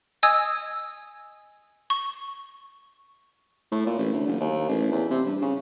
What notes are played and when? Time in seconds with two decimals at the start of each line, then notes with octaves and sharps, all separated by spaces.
0.23 D#5 G#5 D#6 E6 G#6
1.90 C#6
3.72 A2
3.87 A#2
3.99 A1
4.13 D2
4.27 F#1
4.41 D#2
4.69 A1
4.92 E2
5.11 C3
5.26 G2
5.42 C#3